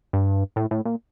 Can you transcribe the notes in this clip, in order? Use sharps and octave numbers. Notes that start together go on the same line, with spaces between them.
G2
A2
A2
A#2